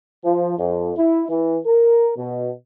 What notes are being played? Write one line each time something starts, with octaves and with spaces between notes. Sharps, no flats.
F3
F2
E4
E3
A#4
B2